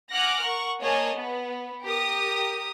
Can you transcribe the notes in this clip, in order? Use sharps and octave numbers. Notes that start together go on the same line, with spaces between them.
F#5 G#5 D6 F6 F#6 A#6
A#4 F#5 C#6
A#3 G#4 C#5 D#5 G#5 A5
B3
G4 A#4 D#6